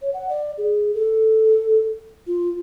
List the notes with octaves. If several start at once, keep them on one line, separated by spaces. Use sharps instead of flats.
C#5
F#5
D5
G#4
A4
F4